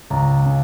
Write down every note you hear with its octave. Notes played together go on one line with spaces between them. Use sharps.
C#2 A#5
C#3